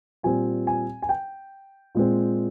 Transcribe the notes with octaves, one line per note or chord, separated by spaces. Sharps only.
A#2 G3 C4 G#5
G#5
G#5
G5
A#2 G#3 C4